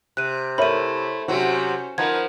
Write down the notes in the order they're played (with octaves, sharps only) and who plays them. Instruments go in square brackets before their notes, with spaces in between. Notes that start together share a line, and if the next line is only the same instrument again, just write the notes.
[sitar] C3 [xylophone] F#6 D#7
[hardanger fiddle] A3 E4 [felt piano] A#4 C#5 E5 [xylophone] B5 D#7
[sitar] C3 F#3 [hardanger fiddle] C#4 C5 [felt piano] F#4
[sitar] F3 [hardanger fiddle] D#4 B4 [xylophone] A#4 G#6 [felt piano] F#5